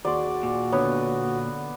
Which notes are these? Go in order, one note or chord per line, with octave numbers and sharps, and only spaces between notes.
D#2 F#4 G#4 D5 C6
A#2
D3 B3 C#5